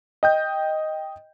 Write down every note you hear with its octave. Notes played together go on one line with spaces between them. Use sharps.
D#5 G5 G6